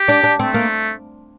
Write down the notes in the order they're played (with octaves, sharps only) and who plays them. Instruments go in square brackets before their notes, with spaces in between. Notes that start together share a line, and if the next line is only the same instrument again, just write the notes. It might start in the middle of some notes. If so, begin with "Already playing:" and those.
Already playing: [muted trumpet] G4
[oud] D4
D4
[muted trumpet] A3 [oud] C4
[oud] A#3